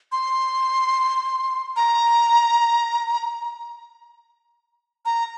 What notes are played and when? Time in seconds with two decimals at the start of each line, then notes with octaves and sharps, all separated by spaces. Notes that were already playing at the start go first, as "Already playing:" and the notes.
0.12 C6
1.76 A#5
5.06 A#5